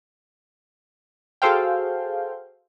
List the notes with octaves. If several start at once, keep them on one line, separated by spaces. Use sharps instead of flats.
F#4 G#4 A4 C5 F5 G5